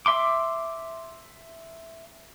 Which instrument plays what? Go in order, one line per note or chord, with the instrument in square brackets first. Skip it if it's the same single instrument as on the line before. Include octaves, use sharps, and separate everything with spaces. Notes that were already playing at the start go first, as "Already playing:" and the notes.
[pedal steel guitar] E5 C6 D6